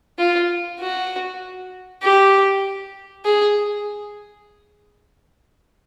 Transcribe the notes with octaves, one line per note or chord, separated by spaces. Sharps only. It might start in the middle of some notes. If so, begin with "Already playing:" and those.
F4
F#4
G4
G#4